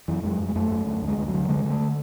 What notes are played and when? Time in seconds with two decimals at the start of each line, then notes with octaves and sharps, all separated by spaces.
0.08 F#2 E3
0.24 F#2 G#3
0.40 F#2
0.48 G#3
0.56 F#2 A3
0.71 F#2
0.86 D2 A3
1.02 D2
1.08 G#3
1.17 D2
1.28 F#3
1.33 D3
1.49 D3 G#3
1.65 D3
1.70 A3